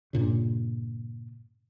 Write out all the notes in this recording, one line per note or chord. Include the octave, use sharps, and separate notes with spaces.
G2 A#2 C#3